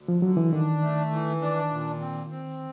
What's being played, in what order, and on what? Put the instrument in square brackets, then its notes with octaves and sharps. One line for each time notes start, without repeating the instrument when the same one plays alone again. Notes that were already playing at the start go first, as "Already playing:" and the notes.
Already playing: [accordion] D2
[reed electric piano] F3
[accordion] D3 [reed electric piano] F#3
[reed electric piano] E3
[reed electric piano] D#3 [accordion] D4
[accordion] A3
E3
D4
A#2
C4
C4